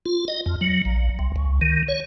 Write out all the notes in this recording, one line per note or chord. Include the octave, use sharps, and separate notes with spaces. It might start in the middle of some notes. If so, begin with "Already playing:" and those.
F4
D#5
F2
F#3
A#1
C2
C#2
D#3
C#5